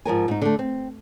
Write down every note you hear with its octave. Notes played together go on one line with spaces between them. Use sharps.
G#2 F3 A#4 G#5
G#2 D#4
D3 A3
C4